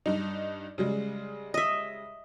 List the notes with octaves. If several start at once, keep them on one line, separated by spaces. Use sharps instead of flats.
G2 D#4
C#3 G3 G#3
D#5 E5